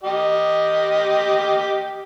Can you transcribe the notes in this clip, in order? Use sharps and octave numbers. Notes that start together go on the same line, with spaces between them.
G4 D#5